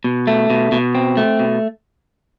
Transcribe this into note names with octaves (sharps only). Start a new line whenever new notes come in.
B2
A3
B2
B2
C4
A3
B2